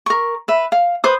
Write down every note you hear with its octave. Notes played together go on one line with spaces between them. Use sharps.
A#4 C#6
B4 E5
F5
B4 C5 D#6